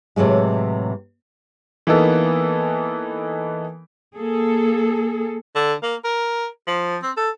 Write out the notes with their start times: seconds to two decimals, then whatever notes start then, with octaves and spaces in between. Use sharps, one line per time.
0.16 A2 C3 E3 F#3 G#3
1.87 E3 A#3 B3 D#4 A4
4.15 A#3 G#4 A4
5.55 D3
5.82 A#3
6.04 A#4
6.67 F3
7.02 C4
7.17 A4